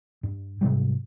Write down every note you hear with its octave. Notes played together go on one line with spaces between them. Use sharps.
G2
G#2 C3 F#3 G3